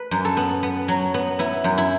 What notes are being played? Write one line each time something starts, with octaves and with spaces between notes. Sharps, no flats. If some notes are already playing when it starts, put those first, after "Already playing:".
Already playing: B4
F#2
A4
B3
B3
F#3
B3
B3 E4
F#2
E4